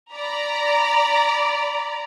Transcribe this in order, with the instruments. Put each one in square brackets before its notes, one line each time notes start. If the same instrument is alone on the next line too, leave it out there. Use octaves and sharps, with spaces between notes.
[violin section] D5 A#5 B5